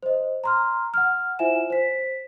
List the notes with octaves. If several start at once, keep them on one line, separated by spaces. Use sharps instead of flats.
C5 D#5
A#5 C6 F6
F#5 F6
E4 F4 C5 E5 G#5 E7
C5 B6